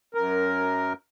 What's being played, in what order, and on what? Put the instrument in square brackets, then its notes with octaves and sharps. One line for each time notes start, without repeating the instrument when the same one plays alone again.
[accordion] F#2 A#4